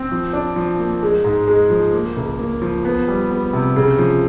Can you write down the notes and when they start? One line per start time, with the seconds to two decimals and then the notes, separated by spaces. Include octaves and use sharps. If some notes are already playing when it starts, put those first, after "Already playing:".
Already playing: C4
0.11 F3
0.33 D4
0.56 F3
0.79 A#3
1.03 G#3
1.24 G#2
1.47 G#3
1.70 F3
1.93 A#3
2.17 C#2
2.39 A#3
2.62 F3
2.85 B3
3.08 G3
3.30 B3
3.53 C3
3.76 C#3
3.98 F3